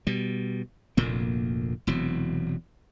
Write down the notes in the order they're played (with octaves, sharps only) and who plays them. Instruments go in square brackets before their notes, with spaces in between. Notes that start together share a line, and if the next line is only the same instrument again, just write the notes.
[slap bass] B2 G3
F1 D2 A#2 A#3
E1 E2 C3 F#3